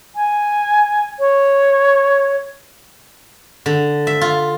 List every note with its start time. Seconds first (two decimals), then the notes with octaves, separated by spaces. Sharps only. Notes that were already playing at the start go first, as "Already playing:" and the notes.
0.16 G#5
1.20 C#5
3.66 D3
4.07 E5
4.21 F4